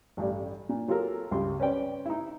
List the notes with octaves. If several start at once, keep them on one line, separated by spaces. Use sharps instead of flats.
A1 G2 G4 D5
A#2
F#3 F4 G4 A4 A#4
C#2 G2 G3 C6
C#4 B4 C5 D5 G5
D#4 E4